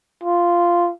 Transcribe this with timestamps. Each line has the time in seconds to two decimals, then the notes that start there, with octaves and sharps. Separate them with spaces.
0.24 F4